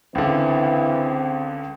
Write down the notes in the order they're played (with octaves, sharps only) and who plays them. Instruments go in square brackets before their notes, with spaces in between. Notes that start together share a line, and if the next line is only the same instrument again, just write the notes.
[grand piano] C#2 D3 [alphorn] E3 [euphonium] C4